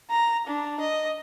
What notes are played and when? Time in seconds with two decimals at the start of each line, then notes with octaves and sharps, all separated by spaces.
0.11 A#5
0.47 D4
0.81 D#5